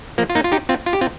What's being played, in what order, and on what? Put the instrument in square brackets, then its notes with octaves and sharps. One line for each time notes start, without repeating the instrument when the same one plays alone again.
[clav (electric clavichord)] F3 A#3
F4
A#3 D#4
F4
D#4 G4
C4 F4
F4
G4
C4 F4